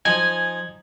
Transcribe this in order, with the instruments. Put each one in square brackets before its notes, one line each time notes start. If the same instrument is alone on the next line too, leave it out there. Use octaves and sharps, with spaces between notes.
[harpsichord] F3 D#4 [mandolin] G#5 [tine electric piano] G#6